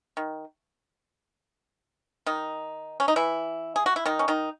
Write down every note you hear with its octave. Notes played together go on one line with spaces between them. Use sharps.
D#3
D#3 D#4
C#4
D#4
E3 E4
G#4
F#4
E4
D#3 D#4
C#4
D#3 D#4